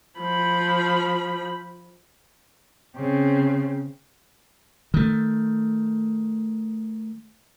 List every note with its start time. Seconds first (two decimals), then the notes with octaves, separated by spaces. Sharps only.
0.19 F3 B5
2.97 C#3 C4
4.94 D#3 A3